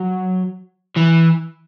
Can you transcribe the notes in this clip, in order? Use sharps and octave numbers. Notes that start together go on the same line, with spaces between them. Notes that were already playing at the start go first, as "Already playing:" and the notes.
Already playing: F#3
E3